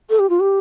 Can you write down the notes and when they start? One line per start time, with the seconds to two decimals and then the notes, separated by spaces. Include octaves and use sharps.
0.10 A4
0.19 G4
0.29 F4
0.40 G4